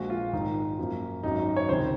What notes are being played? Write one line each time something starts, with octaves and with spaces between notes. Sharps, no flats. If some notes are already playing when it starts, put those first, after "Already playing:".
Already playing: A#1 A#2 F3 G#3 F#4
F4
G#1 G#2 D#3 D#4
F#2 F3 A#3
G#1 F#2 D#3 F#3 D#4
C#5
C#2 C3 D#3 C5